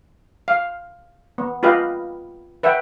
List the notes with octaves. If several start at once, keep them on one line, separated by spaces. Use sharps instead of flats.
F5
B3
F4 G4 B4 D#5 F5
B4 E5 F#5 G5